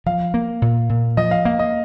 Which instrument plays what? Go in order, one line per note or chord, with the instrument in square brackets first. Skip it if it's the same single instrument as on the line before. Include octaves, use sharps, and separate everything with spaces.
[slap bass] F3 [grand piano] F5
[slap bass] A#3
A#2
A#2
[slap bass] F3 [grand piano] D#5
[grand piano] F5
[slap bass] A#3 [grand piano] F5
[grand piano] D#5